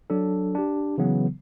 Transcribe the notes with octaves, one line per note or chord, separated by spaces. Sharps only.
F#3 D4 A4
D4 G4
C#3 E3 F#3 B3